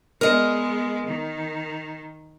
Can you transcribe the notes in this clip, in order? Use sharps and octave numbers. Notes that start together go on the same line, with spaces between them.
G#3 B3 A#4 D#5
D#3